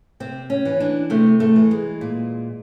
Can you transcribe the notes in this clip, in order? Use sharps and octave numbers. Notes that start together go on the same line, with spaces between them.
C3 C4
C#4
E3
D4
C3 A3
A3
E3
G#3
A#2